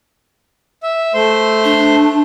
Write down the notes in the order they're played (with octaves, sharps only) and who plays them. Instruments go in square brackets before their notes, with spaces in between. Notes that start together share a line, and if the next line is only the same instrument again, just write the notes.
[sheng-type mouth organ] E5
A3 C5 C6
[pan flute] D4